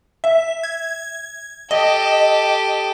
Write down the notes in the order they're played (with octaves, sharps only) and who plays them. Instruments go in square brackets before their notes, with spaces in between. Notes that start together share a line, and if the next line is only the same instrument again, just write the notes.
[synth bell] E5
G#6
[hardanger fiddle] G4 A4 [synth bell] D#5